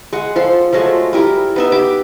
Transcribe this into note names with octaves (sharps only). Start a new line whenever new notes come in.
G#3 F#5
F3 A4 C6
F3 F#3 G#3 A3
G3 E4 A#4
B3 D#4 E5
G4 B5 D6